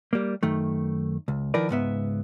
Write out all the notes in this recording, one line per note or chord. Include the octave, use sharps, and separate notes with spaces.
G3 A#3
F#2 D#3 A3
C#2
D#3 F3 E4 A#4 B4 D5
C#2 G#2 B3 E5